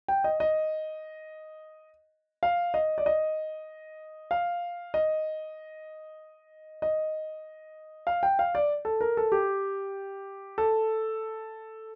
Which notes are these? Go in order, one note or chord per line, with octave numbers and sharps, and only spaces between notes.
G5
D#5
D#5
F5
D#5
D5
D#5
F5
D#5
D#5
F5
G5
F5
D5
A4
A#4
A4
G4
A4